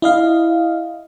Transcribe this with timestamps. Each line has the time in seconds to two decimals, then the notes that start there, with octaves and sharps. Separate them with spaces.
0.02 E4 D#5 F5